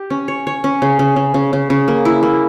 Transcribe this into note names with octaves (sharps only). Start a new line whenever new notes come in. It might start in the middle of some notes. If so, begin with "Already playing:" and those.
Already playing: G4
C#4
C#5
C#5
C#4
C#3
C#3
C#3
C#3
C#3
C#3
A#3
E4
A#3